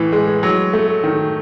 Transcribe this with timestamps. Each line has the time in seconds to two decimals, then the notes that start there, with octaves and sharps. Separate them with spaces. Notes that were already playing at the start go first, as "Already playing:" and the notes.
Already playing: A2 E3
0.12 G#3
0.43 F#3
0.73 A3
1.04 D#3